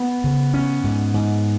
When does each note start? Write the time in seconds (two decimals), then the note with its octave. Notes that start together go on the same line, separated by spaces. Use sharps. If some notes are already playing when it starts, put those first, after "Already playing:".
Already playing: B3
0.24 C#3
0.54 C#4
0.84 G#2
1.14 G#2